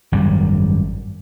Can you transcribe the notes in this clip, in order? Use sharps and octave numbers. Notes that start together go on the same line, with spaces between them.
G#1 F#2 G3